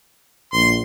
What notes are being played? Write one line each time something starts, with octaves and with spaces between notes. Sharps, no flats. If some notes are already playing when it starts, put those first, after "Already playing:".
A#1 C6